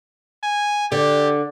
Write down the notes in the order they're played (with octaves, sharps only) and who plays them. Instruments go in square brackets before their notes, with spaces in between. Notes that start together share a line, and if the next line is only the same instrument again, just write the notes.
[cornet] G#5
[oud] D3 [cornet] G4